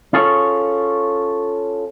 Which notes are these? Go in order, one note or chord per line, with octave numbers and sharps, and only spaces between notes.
C#4 F4 G#4 A4 C#5